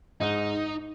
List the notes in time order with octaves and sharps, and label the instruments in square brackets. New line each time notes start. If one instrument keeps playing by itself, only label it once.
[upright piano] G#2 [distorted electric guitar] D#4